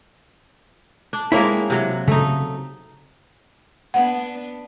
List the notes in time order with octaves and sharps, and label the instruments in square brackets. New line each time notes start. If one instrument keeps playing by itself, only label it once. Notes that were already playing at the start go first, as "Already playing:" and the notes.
[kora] D4
[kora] G#3 A#3 C4 [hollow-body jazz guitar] E4 C#5
[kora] C3 F#3
[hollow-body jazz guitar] C#3 [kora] A3 D#4
[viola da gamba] B3 D4 [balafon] F#5